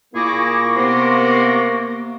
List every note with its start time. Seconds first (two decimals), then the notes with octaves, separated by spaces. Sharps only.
0.14 A#2 A#3 E4 G#4 C#6 D6 A#6
0.76 C3 B3 C6